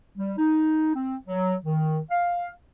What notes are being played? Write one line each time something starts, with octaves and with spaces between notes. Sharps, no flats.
G3
D#4
C4
F#3
D#3
F5